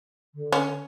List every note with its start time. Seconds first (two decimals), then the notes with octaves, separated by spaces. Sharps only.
0.34 D3
0.52 C#4